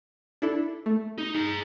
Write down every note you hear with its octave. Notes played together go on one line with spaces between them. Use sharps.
D4 E4 A4
A3
D#4
G#4 A#5